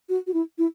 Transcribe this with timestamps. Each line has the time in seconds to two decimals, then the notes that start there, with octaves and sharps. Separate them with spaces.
0.09 F#4
0.27 F#4
0.34 E4
0.58 E4